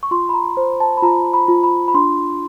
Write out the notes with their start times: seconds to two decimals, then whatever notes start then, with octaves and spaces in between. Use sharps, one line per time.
0.03 C#6
0.11 F4 C6
0.29 B5
0.34 A#5
0.57 C5
0.80 A5
0.97 B5
1.02 F4 A#5
1.34 B5
1.48 F4
1.63 B5
1.88 B5
1.94 D4 C6